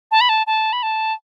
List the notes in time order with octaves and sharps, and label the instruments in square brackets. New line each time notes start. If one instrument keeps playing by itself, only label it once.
[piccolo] A5
B5
A5
A5
B5
A5